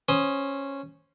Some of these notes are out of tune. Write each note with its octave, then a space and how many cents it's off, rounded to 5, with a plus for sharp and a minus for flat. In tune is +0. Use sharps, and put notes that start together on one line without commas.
C#4 -5 C5 +0 D#6 +0